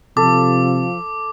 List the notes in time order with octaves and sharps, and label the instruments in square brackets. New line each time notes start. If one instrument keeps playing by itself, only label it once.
[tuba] C3 [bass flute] F3 [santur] A4 [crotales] D6